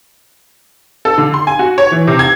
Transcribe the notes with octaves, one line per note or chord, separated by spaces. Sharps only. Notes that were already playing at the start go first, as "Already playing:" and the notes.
A4
D3
C6
G#5
F#4
C#5
E3
C3
G#6